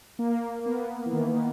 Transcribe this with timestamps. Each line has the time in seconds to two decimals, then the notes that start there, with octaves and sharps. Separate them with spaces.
0.19 A#3
0.59 A#3
0.66 B3
1.06 E3
1.13 D#3